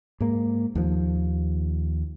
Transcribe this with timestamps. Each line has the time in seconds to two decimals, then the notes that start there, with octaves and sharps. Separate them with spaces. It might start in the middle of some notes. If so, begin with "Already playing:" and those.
0.20 G#2 A#3
0.75 D#2 F3